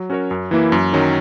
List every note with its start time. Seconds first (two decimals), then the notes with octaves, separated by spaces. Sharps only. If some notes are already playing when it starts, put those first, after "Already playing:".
Already playing: F#3
0.10 C#4 F#4 A#4 C#5
0.31 F#2
0.51 E3 A#3 E4 B4
0.72 F#2
0.93 D#3 F#3 C#4